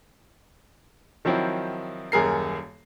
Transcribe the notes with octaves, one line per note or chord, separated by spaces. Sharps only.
D#3 F3 F#3 C4 E4
D#1 F#2 G#4 A#4 C7